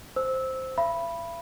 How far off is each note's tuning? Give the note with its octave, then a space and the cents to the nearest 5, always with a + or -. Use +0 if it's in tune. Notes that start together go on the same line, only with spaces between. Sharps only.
C5 +0 E6 -15
E5 +45 B5 -5